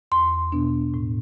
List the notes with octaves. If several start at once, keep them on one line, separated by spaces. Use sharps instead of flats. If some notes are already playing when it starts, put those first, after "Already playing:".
E2 C6
B2 B3 D4
A2